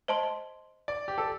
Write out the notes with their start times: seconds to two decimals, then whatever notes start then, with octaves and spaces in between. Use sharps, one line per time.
0.08 C5 D#5 A5 C6
0.88 D5
1.08 G4
1.18 A4